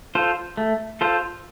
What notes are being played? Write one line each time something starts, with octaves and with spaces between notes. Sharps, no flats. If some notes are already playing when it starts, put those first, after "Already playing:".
F4 A4 C5
A3
F4 A4 C5